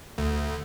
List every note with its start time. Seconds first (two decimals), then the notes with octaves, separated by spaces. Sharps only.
0.18 D2